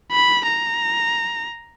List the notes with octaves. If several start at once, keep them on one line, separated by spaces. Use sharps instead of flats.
B5
A#5